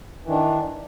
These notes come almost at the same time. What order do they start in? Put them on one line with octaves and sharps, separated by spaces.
E3 D#3 D4